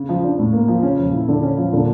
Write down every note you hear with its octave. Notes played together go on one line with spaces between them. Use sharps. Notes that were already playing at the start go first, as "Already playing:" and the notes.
Already playing: C#3
F3
D4
A2
A#3
F3
C#3 C#4
F3
A#2
E4
D3
C#4
F3
A#2 D3